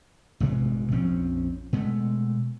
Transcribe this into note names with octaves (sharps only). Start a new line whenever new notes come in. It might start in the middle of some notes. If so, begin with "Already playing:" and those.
A1 G2 B2 G#3
A#1 F2 C4 C#4
B2 G#3 A3